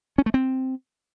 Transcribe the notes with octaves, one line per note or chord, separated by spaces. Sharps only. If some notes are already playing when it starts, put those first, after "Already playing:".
C#4
A3
C4